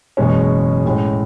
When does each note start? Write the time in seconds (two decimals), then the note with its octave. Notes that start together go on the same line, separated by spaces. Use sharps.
0.17 F#1 E2 B2 G#3 C#4
0.85 A2 G#3 C#4